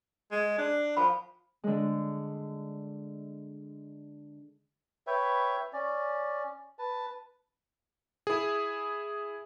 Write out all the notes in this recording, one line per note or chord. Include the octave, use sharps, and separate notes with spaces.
G#3
D4
F3 F5 B5
D3 G#3
B4 C#5 E5 G5
C#4 D5
B4 A5
E4 G#4